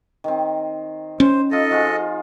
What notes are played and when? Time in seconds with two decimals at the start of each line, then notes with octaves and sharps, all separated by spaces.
0.24 D#3 C4
1.20 C#4 C5
1.51 D#4 F4 A4 D#5
1.71 F3 F4 G#4